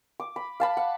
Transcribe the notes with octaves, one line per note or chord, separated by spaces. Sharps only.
D6
B5
F5 A5 B5
F#5